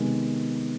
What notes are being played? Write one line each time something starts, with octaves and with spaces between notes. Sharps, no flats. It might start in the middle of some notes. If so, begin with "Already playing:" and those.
Already playing: C3 D#3 G#3 B3